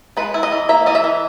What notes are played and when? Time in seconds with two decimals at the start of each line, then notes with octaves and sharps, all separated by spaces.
0.17 G#3 B4
0.34 E4
0.43 D#5
0.52 E3
0.69 A#3 E5
0.86 E3 D#5
0.95 E5
1.04 E3